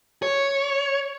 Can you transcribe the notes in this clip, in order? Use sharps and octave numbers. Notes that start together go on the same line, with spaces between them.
C#5